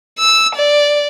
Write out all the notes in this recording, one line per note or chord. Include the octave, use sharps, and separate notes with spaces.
E6
D5